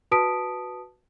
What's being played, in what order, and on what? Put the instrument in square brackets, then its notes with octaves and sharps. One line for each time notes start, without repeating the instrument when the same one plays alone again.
[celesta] F#4 B4 A5 D#6 B6 D7